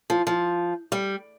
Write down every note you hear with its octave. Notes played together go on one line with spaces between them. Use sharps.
F3
F3
G3